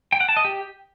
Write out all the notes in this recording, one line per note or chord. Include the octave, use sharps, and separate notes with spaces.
G5
F#5
A5
D#5
G4